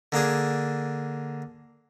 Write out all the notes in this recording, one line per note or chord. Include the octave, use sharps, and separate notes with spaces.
D3 A#3 D4 G#4